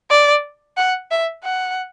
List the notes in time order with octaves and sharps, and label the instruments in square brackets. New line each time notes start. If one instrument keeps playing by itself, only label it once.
[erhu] D5
F#5
E5
F#5